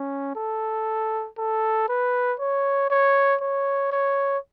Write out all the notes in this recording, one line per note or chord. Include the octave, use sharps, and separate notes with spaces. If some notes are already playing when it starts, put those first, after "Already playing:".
Already playing: C#4
A4
A4
B4
C#5
C#5
C#5
C#5